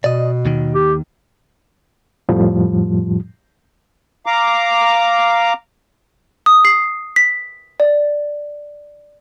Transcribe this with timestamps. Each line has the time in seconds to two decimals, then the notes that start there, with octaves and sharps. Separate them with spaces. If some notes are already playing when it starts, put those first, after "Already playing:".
0.04 B2 D5 D#5
0.45 D#2 D#3
0.74 G4
2.29 F2 A2 F3 G3
4.26 F5 A#5 D6
6.46 D#6
6.65 C7
7.16 B6
7.80 D5